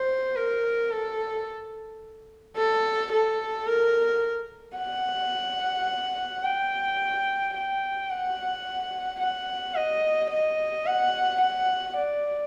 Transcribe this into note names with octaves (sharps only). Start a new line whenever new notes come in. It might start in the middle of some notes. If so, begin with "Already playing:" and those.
Already playing: C5
A#4
A4
A4
A4
A#4
F#5
G5
G5
F#5
F#5
D#5
D#5
F#5
F#5
D5